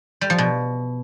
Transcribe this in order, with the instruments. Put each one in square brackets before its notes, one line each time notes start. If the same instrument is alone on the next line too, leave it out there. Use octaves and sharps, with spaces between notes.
[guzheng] G3
F3
B2